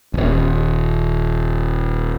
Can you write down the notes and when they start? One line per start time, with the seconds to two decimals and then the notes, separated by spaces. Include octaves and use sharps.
0.14 D#1 G#1